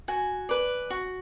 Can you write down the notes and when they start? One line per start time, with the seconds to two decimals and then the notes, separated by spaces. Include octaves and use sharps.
0.08 F#4 G#5
0.49 B4 D5
0.90 F#4